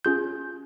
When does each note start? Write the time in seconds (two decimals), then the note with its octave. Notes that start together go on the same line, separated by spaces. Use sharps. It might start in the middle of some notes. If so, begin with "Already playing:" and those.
0.05 C#4 F4 G#4 G6